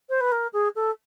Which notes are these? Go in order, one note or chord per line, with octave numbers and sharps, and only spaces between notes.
C5
B4
A#4
G#4
A4